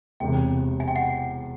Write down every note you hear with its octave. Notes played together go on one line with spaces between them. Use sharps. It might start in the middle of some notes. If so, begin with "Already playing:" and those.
E1 E2 C3 G5
G#5
G5
F#5